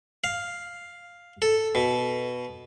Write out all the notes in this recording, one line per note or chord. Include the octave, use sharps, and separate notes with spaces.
F5
A4
B2